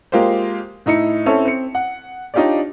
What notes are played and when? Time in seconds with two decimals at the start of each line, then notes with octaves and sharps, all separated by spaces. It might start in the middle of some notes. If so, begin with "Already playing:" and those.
0.12 G#3 A#3 F4 G4 C5
0.86 A2 D#4 E4 C#7
1.26 C4 C#4 E4 A4 C#5 E5
1.45 C4 C#7
1.75 F#5
2.34 D4 D#4 F4 G4 C#5 D5